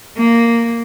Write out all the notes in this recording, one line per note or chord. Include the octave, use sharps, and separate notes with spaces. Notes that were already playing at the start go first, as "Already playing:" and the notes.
A#3